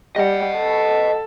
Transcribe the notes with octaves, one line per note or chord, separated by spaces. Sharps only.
G3 D#5 F#5
A4